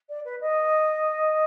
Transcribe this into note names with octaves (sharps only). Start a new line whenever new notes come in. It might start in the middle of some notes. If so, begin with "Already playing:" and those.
D5
B4
D#5